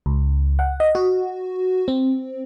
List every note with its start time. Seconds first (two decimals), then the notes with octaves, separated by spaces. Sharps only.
0.06 C#2
0.59 F#5
0.80 D#5
0.95 F#4
1.88 C4